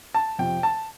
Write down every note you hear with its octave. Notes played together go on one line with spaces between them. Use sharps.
A5
F2 C3 F3 G5
A5